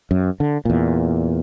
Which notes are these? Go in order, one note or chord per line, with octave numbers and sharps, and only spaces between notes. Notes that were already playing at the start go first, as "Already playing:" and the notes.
F#2
D3
E2 A#2